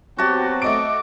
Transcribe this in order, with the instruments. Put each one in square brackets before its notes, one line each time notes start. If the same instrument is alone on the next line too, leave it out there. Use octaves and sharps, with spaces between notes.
[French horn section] F#3 B3 C4 [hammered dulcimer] F#4 A5 [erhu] G4
[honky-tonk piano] A3 D#5 D7 [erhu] D6